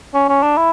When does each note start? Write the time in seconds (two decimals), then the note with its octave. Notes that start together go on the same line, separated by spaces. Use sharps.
0.14 C#4
0.29 C#4
0.43 D4
0.57 E4